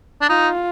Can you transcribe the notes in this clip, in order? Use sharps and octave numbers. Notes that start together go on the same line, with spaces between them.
D4
D#4 F4